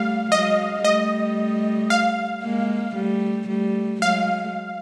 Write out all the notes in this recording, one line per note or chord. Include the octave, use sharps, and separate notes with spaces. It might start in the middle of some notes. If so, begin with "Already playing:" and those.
Already playing: G3 A3 F5
F#3 G#3 D#5
G3 A3 D#5
F5
G#3 A#3
G3 A3
G3 A3
F#3 G#3 F5